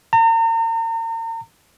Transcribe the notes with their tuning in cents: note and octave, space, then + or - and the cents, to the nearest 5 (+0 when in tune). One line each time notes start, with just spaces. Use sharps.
A#5 -40